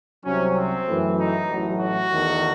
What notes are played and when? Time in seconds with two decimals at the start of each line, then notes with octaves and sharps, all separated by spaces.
0.24 C2 C3 F#3 C#4
0.56 C4
0.87 F#2 E3 A3
1.19 D#4
1.49 A1 A2 F#3
1.80 F#4
2.12 E2 D#3 A3